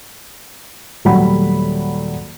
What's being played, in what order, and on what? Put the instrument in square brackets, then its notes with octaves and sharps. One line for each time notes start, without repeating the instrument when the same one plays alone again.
[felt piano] D#1 F#3 G3 A3 F#5 B5